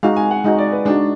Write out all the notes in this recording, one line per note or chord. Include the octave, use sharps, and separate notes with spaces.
G#3 D#4 F#4 F5
G#5
F#5
G#3 D#4 F#4 D#5
D5
B4
G#3 D4 D#4 F#4